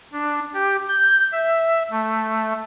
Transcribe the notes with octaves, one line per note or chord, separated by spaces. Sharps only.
D4
G4
G6
E5
A3